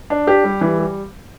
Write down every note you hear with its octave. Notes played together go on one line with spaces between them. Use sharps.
D4
G4
G3
E3
G3